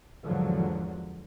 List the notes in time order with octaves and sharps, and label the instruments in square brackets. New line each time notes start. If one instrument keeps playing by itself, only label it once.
[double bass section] E2 G#2 D3 F3 F#3